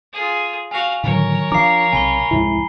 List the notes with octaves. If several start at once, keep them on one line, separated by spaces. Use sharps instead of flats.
F4 G#4
F#4 F5 G#5 F7
A2 D3 D#3 F#3 A#4 C#5
F3 D4 F5 A#5 D6 C7
B1 C3 G#5 B5 G7
C2 F2 G#2 E4